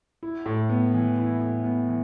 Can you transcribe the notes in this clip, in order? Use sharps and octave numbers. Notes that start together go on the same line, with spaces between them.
E4
A2
B3
E3
E4
A2
B3
E3